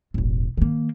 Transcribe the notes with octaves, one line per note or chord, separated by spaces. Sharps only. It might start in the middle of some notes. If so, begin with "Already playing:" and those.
E1 A1
D#3 A#3